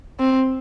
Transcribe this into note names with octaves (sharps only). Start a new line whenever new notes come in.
C4